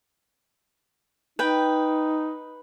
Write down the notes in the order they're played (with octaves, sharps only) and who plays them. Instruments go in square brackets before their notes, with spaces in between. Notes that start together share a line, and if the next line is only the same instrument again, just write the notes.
[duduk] D#4 [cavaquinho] B4 G5